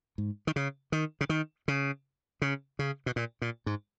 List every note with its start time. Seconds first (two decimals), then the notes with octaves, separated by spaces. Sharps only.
0.18 G#2
0.47 D#3
0.56 C#3
0.92 D#3
1.21 C#3
1.29 D#3
1.68 C#3
2.42 C#3
2.79 C#3
3.06 B2
3.16 A#2
3.42 A#2
3.66 G#2